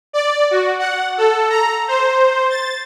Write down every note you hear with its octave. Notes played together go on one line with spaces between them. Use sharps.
D5
F#4
F#5
A4
A#5
C5
A6